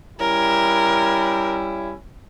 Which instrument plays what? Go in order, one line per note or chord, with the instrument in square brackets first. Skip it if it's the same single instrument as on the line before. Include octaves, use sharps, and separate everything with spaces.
[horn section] G3 C#4 E4 [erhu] A#4